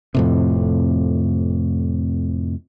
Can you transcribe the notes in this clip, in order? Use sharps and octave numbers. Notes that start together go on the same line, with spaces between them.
F2 A2 C3